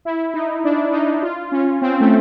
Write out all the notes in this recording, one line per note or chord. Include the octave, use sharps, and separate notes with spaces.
E4
D#4
D4
D#4
F4
C#4
C4
A3